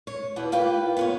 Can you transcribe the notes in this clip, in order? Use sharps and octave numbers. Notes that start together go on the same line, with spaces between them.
C#5
E2 B2 E3 B4
A#3 F4 G4 B4
B3 B4 C#5